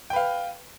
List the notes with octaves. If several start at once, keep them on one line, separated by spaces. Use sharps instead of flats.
B4 F5 G5